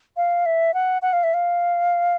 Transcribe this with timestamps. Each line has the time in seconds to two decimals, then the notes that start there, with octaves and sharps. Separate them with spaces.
0.17 F5
0.46 E5
0.74 F#5
1.02 F#5
1.13 F5
1.23 E5
1.34 F5